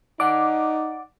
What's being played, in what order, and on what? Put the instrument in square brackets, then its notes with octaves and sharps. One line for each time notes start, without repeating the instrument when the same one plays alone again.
[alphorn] D#4 [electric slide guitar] D5 F#5 [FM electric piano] D6